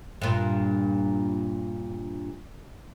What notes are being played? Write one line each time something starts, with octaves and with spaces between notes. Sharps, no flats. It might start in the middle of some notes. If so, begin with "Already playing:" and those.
G2 A#2